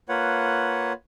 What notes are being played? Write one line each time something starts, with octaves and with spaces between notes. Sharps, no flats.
A#3 F4 B4 C#5 F#5